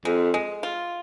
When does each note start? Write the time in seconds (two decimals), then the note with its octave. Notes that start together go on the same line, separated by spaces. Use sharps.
0.05 F2 G#3
0.34 G#3
0.63 F4